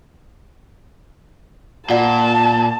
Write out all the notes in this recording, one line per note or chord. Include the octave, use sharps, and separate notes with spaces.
A#2 F4 D5 F#5 A5